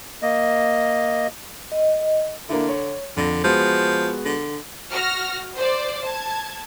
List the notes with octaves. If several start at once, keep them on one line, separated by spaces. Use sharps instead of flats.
A#3 D#5
D#5
D3 A#3 D4 E4
C#5
F2 D3 A#6
F3 G#3 B3 F#4
D3
F#4 F6 A#6
C5 D5
A5 G#6